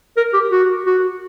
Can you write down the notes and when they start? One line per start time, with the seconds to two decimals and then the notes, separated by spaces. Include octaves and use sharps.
0.17 A#4
0.34 G4
0.52 F#4
0.86 F#4